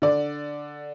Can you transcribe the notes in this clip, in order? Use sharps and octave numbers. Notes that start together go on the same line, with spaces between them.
D3 D5